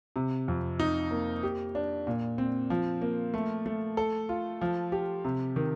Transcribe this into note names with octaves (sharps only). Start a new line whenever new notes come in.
C3
F2
D#4
A#3
G4
D4
A#2
C4
F3
A#3
A3
A3
A4
F4
F3
G4
C3
D#3